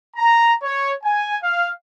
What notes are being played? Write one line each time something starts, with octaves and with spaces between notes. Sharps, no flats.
A#5
C#5
G#5
F5